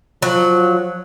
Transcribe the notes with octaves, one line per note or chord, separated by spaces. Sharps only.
F3 F#3